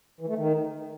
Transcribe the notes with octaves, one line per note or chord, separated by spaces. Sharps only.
E3
A3
D#3